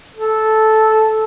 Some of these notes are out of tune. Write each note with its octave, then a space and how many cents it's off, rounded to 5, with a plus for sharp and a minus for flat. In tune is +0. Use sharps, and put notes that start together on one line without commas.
A4 -10